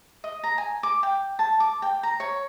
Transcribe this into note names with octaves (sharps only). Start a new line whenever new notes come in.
D#5
A#5
G#5
D6
G5
A5
D6
G5
A#5
C#5